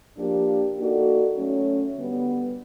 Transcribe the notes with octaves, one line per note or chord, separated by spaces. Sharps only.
F3 A#3 D4 G4
A#3 D#4 F#4 A4 D5
F#3 A3 C#4
D3 G3 B3